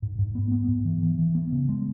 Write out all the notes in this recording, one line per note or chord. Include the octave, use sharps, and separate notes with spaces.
G#2
G#2
B3
B3
G#2
E3
E3
E3
B3
C#3
G#3